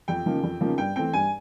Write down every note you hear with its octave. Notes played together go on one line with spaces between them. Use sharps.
F2 G5
C#3 F3 A#3 D#4
F2
C#3 F3 A#3 D#4
G2 G5
E3 A3 C4 G5
G2 G#5